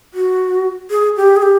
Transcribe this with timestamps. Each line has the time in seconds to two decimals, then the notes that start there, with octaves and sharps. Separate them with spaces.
0.14 F#4
0.91 G#4
1.17 G4
1.36 G#4
1.42 G4